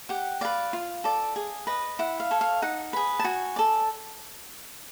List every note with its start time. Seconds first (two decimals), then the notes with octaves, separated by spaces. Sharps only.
0.09 G4 F#5
0.41 B4 D5 F5
0.73 F4
1.04 A4 D5
1.36 G#4
1.67 B4 D#5
1.99 E4 F#5
2.20 F5
2.31 A4 C#5
2.41 F5
2.62 D#4 F#5
2.93 G#4 B4
3.19 A5
3.24 F#4 G#5
3.56 A4 D5